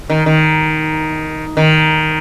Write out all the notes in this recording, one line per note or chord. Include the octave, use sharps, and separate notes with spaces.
D#3
D#3
D#3